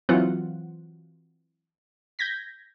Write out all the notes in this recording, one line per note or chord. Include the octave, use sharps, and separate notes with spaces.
E3 F#3 C4 F4 F#5
G6 G#6 A#6 B6